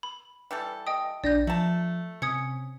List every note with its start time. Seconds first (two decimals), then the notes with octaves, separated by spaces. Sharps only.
0.03 B5
0.51 E3 G3 A4
0.87 D#5 G5 D#6
1.24 A#1 D4 D5 G6 A#6
1.47 F3 A3 A5
2.22 C3 C#4 D#6 G#6 C#7